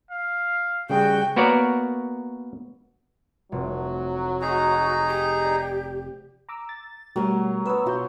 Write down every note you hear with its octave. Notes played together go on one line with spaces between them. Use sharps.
F5
C#3 G3 F#4 G#4 G5
A#3 B3 F#4 A#4 C#5 D5
F1 F#3
D#4 F#4 G#4 A#5
G4
D5
A#5 D6 E6
A6
B2 F#3 G3 A3 A#4 C#5
B3 B4 C#5 E6
B2 F4 F#4 G6